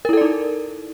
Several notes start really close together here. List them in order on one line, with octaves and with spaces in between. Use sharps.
A#4 E4 A4 D5 D#4